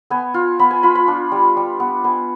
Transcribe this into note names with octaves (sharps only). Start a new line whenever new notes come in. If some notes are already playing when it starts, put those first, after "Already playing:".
B3 G#5
F4
B3 B5
G#5
F4 B5
B5
D4
G3
G3
B3
B3 G#5